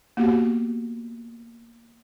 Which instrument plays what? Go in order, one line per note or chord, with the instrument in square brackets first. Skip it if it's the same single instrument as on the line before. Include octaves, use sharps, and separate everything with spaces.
[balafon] A#3 B3 F#4 G4